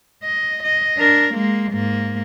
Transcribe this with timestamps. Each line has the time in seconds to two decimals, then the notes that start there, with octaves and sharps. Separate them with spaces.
0.23 D#5
0.64 D#5
0.98 D4 A#4
1.35 G#3 A#3
1.73 G#2 A#3